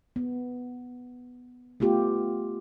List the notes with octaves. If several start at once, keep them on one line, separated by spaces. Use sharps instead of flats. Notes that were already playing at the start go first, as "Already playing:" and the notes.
B3
A3 B3 F4 G4